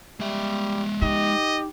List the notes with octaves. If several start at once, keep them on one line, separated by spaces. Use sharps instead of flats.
G3 G#3 E5
D#4 G4 D#5